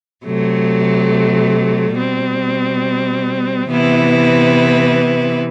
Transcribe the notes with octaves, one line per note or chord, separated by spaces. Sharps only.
C3 F#3 A3
B2 G3 C4
C3 E3 B3 E4 B4